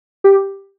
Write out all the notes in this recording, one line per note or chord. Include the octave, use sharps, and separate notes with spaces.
G4